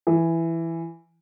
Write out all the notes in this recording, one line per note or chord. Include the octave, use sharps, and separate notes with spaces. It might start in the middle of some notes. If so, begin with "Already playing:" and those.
E3